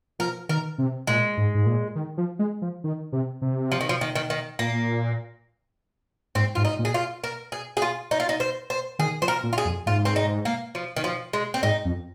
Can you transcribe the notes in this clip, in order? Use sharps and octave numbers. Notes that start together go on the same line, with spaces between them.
F3 A#4
D#3 A#4
C3
A#2 G#3
G#2
G#2
A#2
D#3
F3
G#3
F3
D#3
C3
C3
F3
D#3
F3
D#3
D#3
D#3
A#2 A#3
G#2 C4
G#2 F4
D#4
A#2
G#4
F4
A#4
G#4
G#4
F4
D#4
F4
D#4
C5
C5
D#3 G#4
F3 C5
A#4
A#2
F4
G#4
F2
G#2 F4
C4
D#4
A#3
F3
D#3
F3
G#3
C4
G#2 D#4
F2